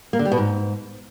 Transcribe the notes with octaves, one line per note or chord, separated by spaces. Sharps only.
A#3
D3
G3
B2
G#2